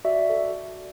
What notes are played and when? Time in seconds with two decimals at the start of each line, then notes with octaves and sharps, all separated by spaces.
0.05 F#4 D5 E5
0.30 A4